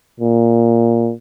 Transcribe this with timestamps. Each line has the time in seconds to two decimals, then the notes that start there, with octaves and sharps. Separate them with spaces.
0.20 A#2